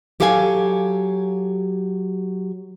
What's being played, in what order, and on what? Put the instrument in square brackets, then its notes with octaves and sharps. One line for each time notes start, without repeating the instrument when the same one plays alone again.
[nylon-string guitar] F#3 G4 A4 F5 G5 G#5